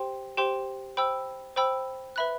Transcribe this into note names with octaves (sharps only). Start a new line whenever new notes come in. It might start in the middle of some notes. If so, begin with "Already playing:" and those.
Already playing: G4 C5 G5 C6
G4 C5 G5 C6
C5 G5 B5 E6
C5 G5 B5 E6
B4 E5 B5 F#6